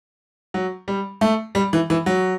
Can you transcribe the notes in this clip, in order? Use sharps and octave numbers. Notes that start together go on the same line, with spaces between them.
F#3
G3
A3
G3
E3
E3
F#3